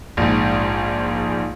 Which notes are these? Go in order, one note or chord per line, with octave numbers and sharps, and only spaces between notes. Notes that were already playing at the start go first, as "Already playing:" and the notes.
A#1 G#2